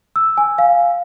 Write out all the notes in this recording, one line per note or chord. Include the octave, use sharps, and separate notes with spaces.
E6
G#5
F5